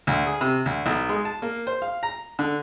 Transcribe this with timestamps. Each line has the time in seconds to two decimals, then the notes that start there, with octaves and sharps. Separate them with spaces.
0.07 D2
0.27 G#4
0.41 C3
0.66 D2
0.86 B1
1.09 G#3
1.25 A5
1.42 A#3
1.67 C5
1.82 F5
2.03 A#5
2.39 D3